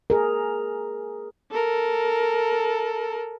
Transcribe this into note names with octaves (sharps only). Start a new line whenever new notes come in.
G#4 A#4
A4 A#4